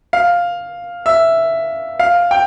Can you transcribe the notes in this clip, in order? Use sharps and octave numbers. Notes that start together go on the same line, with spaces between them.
F5
E5
F5
G5